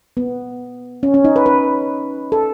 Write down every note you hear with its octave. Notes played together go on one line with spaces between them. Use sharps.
B3
C#4
C#4
D#4
B4
B4
A4